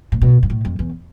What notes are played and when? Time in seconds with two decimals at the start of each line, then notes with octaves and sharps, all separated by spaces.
0.12 A2
0.21 B2
0.43 G2
0.50 A2
0.65 F2
0.79 E2